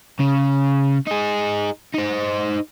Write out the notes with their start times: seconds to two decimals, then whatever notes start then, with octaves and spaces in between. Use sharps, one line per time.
0.20 C#3
1.07 D#4 G#4
1.94 D#4 C5